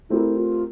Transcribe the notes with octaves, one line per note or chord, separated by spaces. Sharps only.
A3 C4 E4 G4 A#4
F4